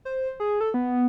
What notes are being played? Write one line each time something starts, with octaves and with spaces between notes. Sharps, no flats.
C5
G#4
A4
B3